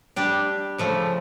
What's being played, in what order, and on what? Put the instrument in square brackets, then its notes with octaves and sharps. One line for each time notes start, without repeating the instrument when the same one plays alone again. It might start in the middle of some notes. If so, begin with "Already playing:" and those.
[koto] G3 D4 G4
C#3 F3 A3